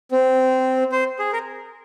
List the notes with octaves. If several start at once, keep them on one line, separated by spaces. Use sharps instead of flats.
C4
C5
G#4
A#4